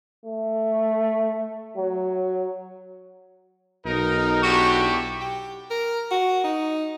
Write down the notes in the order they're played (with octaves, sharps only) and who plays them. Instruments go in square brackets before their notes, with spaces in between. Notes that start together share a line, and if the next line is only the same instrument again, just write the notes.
[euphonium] A3
F#3
[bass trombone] B1 [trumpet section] D#4 A#4
[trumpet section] D4 E4 G4 [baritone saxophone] F#4 [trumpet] C#6
[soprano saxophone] G4
A#4
F#4
D#4